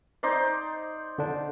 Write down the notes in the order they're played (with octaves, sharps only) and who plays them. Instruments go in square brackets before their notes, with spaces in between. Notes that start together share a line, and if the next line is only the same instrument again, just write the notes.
[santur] D#4 C5 D5
[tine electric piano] D3 D4